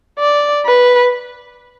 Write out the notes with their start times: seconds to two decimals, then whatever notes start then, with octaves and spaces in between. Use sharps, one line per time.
0.19 D5
0.66 B4